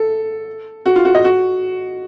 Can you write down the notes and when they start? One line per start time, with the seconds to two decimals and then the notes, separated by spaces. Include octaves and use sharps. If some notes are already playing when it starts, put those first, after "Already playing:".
Already playing: A4
0.86 F#4
0.96 F4
1.05 F#4
1.15 D#5
1.24 F#4